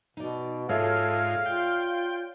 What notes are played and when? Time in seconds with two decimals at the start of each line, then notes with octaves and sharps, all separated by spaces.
0.17 B2 D#4 D5
0.69 G#2 F4 A4 C#5 D5 E5 F5
1.46 F4 G5